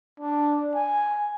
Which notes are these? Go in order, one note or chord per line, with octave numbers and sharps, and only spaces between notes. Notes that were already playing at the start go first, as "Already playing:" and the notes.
D4
G#5